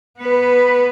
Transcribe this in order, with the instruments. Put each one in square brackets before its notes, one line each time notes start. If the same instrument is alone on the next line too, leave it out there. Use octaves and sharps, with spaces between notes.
[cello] B3 B4